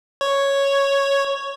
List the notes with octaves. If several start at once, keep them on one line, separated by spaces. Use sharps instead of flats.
C#5